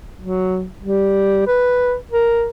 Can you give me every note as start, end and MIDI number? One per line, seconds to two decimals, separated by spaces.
0.19 0.65 54
0.82 1.46 55
1.47 1.95 71
2.11 2.48 70